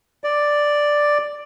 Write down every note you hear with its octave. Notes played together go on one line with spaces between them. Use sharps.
D5